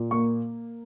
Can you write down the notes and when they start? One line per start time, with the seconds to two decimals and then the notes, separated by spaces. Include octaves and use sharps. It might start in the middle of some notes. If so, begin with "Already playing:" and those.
Already playing: A#2
0.11 A#3 C#6